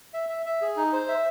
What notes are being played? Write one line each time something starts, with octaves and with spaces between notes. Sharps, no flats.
E5
E5
E5
G#4
D#4
C5
E5